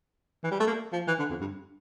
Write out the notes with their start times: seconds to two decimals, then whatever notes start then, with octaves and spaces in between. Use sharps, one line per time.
0.44 E3
0.51 G3
0.60 A3
0.67 A#3
0.93 F3
1.08 E3
1.19 D3
1.30 F2
1.41 G2